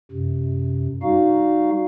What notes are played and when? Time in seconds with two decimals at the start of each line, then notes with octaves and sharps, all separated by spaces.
0.11 F#2 C3
1.03 G3 D#4 F#4 F5